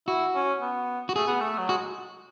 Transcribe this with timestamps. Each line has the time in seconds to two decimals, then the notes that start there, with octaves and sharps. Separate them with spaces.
0.07 E4 F#4
0.35 C#4
0.61 B3
1.09 F#4
1.16 A3 G#4
1.27 B3
1.40 A3
1.58 F#3
1.69 G#3 F#4